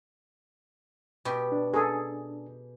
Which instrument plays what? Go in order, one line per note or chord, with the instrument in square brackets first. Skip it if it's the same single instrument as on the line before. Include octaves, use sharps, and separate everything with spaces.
[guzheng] B2 G4
[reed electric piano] D4
[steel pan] G#4 A4